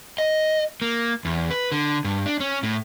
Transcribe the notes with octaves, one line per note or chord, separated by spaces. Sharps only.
D#5
A#3
E2
B4
D3
G2
D4
C#4
A2